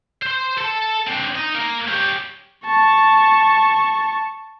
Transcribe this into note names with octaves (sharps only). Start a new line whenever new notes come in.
C5 C6
A4 A5
C4 D4
D#4
A#3
C#4 G4
A5 C#6